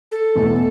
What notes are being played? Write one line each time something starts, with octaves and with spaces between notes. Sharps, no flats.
A4
E2 B2 A3